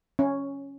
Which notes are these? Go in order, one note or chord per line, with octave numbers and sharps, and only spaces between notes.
C#4